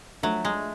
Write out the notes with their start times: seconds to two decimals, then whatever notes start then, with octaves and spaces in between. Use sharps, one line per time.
0.23 F3 F#3 A3 D4
0.45 G#3